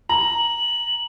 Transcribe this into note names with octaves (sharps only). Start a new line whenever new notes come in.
A#5 F#7